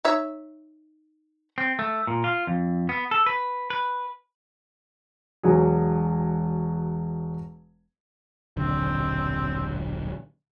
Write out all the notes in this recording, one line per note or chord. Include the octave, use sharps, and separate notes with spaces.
D#4 C#5 E5
C4
A3
A#2
F4
F2
B3
A4
B4
B4
E1 F#3 G#4
D#1 B1 D3 C4